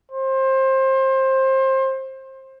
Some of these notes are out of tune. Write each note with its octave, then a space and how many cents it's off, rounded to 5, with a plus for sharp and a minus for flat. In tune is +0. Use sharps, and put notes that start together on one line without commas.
C5 +25